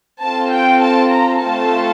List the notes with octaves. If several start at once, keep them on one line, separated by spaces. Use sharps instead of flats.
C4 F4 A4 A5
G5
A5
A#5
A3 C4 F4 A4 A5